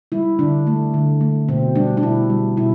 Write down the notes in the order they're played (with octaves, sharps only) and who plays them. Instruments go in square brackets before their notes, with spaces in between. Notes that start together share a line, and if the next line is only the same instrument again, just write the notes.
[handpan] G3 E4
D3 D4
A3
D3
A3
B2 C4
G3 D4
D4
B2 E4
G3
B2 E4